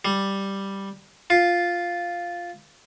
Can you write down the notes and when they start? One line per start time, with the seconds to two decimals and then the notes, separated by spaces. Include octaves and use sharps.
0.05 G3
1.30 F4